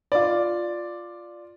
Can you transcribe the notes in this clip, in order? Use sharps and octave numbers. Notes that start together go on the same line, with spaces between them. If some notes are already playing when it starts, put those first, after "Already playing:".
F4 D5